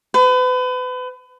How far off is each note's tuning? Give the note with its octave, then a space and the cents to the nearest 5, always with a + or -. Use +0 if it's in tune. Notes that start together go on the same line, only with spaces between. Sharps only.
B4 +35